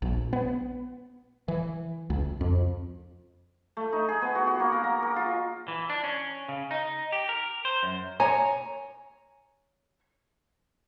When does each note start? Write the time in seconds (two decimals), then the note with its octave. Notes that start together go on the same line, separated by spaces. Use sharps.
0.02 A#1
0.33 B3
1.48 E3
2.10 C#2
2.41 F2
3.77 A3
3.93 D#4
4.09 G#4
4.22 B3
4.35 F#4
4.47 F#4
4.60 A#3
4.72 A#4
4.84 A#5
5.03 A#4
5.16 F4
5.68 E3
5.90 D4
6.04 C#4
6.49 C#3
6.71 D#4
7.12 G4
7.29 A#4
7.65 C5
7.83 F#2
8.20 C#5 G#5 A#5